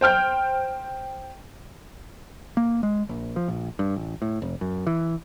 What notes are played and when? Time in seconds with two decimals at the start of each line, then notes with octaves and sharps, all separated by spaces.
0.01 C5 G5 F6 G6
2.57 A#3
2.83 G#3
3.09 A#1
3.36 F3
3.48 A#1
3.79 G2
3.96 A1
4.22 A2
4.42 F1
4.61 F#2
4.87 E3